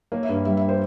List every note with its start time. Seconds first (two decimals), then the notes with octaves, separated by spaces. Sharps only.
0.12 A#3 C#5
0.23 E5
0.29 G2
0.45 G3 E5
0.57 E5
0.69 C5